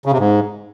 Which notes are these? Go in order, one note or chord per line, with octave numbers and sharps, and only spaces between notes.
C#3
C3
G#2